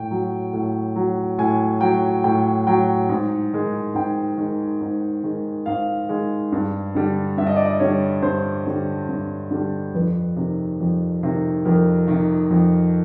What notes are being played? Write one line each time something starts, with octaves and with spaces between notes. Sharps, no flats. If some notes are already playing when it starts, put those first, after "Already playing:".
Already playing: A2 G5
F#3
A2
F#3
A2 G#5
F#3 G5
A2 G5
F#3 G5
G#2
D#3 G#3
G#2 G5
D#3 G#3
G#2
D#3 G#3
G#2 F5
D#3 G#3
G2
D3 G3
G2 E5
D#5
D5
D#5
D3 G3 C#5
G2 C5
D3 G3
G2
D3 G3
F2 B4
C3 D#3
F2
C3 D#3
F2 A#4
C3 D#3
F2